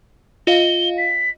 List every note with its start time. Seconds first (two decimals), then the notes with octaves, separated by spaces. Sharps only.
0.47 F4 D#5 F5 G7
0.98 B6